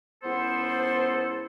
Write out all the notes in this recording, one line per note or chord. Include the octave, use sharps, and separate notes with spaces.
C#2 B3 E4 A4 C5